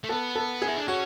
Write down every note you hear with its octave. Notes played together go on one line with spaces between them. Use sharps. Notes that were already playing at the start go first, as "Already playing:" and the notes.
A3
B3 A4
A4
G#4
E4
D4
C#4 F#4